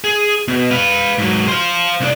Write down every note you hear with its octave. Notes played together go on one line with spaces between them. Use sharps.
G#4
B2
B4 F5
G#2 F#3
C5 F5
C2 D4